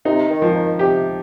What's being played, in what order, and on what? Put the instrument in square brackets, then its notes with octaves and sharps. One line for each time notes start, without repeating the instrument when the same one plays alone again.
[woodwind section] C3 [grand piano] D#4
[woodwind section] D#3
[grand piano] F3
[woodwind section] D#3
[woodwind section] C3 [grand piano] G4